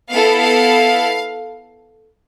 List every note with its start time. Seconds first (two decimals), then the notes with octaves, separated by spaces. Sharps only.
0.10 B3 E4 A4 F5
0.39 F5